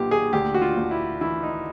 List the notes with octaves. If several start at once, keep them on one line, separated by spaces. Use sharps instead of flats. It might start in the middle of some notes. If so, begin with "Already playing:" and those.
Already playing: B1 A#2 G4
G#4
D2 G4
F#4
F4
D2
E4
E3 E4
D#4